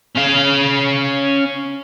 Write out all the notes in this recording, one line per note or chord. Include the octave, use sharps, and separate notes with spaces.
C#4 F5